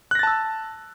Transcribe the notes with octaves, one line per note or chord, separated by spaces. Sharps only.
A5 E6 F#6 A6 A#6